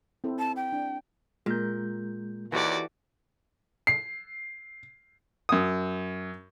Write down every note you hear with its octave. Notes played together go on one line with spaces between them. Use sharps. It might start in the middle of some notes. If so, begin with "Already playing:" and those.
C4 E4 A4
A5
G5
D4
A#2 G#3 A#4 G6
D#2 E3 F#4 G4 A4 D5
C7
F#2 D#6